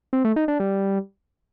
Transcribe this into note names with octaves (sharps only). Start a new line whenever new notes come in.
C4
A3
D#4
D4
G3